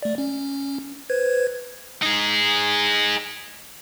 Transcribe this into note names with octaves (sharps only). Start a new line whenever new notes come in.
A3 D5
C#4
B4 C5 G#6
D#4 G#4